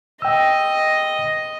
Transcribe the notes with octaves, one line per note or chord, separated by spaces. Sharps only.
D#5 G5 E6